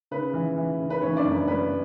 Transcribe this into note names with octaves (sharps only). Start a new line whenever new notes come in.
C#3 B4
E3
E3
C#3
B4
E3 C#4 C#5
D4 D5
F#2
B4
F#2 B4